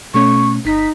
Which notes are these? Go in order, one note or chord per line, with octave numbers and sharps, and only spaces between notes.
B2 A3 C#4 C#6
G1 D#4 B6